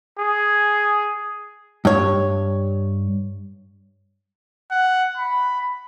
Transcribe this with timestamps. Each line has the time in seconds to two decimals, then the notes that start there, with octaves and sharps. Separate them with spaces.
0.18 G#4
1.85 G2 C#5
4.71 F#5
5.17 B5